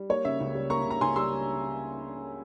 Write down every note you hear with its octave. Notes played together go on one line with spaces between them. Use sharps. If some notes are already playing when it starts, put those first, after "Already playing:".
Already playing: G3
A#3 C#5
C#3 E5
C#2
G3
A#3 A#5 C#6
C#3 A#5
C#2 G#5 C6
G3 C6 E6